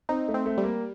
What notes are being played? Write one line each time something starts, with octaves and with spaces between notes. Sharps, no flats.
C4 D#4
A3
C4
A3
G3
A#3